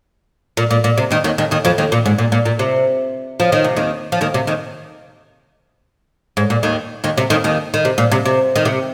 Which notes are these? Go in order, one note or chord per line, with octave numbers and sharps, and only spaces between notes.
A#2
A#2
A#2
C3
D#2 D#3
D#2 D#3
D#2 D#3
D#2 D#3
F2 F3
D#2 D#3
A#2
G#2
A#2
A#2
A#2
C3
F3
D#3
C3
D#2 D#3
F3
D#2 D#3
C3
D#2 D#3
G#2
A#2
D#2 D#3
D#2 D#3
C3
D#2 D#3
D#2 D#3
D#3
C3
A#2
C3
C3
D#3
C3